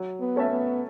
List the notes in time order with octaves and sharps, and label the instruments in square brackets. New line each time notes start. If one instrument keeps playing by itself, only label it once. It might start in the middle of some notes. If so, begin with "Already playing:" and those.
Already playing: [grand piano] F#3
[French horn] B3
[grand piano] A3 C#4 A4 E5
[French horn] B3